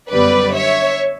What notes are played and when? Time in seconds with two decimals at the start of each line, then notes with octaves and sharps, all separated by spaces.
0.11 F#2 D3 G3 B3 B4 D5
0.54 C#5 E5